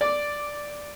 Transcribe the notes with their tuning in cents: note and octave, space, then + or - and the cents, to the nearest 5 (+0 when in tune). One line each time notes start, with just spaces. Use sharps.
D5 +0 D6 -10